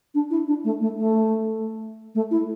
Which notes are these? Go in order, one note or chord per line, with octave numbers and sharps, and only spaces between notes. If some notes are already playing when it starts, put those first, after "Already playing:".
D4
E4
D4
A3
A3
A3
A3
E4